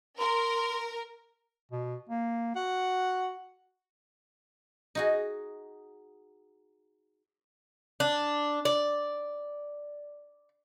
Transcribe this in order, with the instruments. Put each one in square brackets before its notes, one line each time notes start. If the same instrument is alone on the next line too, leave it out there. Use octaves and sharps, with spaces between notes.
[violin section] A#4 [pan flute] C6
[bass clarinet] B2
A#3
[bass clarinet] F#4 [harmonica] F#5
[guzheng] D#4 F#4 G#4
[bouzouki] D4
D5